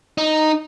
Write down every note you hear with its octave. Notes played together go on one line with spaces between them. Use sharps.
D#4